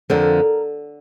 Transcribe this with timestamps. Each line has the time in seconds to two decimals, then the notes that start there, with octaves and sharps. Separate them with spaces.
0.10 F2 D3 F3 A#4